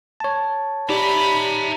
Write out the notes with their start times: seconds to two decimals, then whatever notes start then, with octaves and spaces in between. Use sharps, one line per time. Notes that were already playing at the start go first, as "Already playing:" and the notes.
0.20 C#5 A5
0.89 D#4 G4 D5 E5 A#5 B5